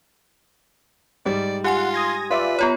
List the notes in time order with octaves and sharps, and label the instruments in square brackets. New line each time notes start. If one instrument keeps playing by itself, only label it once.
[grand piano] G#2 G3 [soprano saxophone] D5
[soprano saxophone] F4 [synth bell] G4 G#5 C6 [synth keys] F#5
[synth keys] D#6 G#6 A#6
[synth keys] F4 D5 E5 [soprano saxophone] B4
[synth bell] B3 F4 C#5 [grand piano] A#5 B5